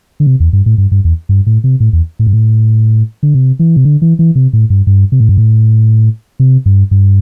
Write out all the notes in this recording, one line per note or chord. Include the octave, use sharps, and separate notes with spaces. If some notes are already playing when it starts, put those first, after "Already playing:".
D3
C3
E2
G2
A2
G2
G2
E2
G2
A2
C3
A2
E2
A2
G2
A2
D3
C3
E3
C3
D3
E3
E3
C3
A2
G2
G2
C3
A2
G2
A2
C3
G2
G2